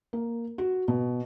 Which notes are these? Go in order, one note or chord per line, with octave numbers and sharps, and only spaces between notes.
A#3
F#4
B2